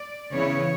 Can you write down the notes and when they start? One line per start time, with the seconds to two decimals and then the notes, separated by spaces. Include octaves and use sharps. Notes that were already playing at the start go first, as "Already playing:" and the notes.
Already playing: D5
0.33 C#3 E3 B3 E4 C#5